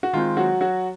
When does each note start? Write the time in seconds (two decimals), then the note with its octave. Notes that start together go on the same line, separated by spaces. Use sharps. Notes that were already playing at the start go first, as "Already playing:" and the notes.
0.03 F#4
0.13 D#3 G#3 C4 F4
0.37 F#3 F#4
0.61 F#3 F#4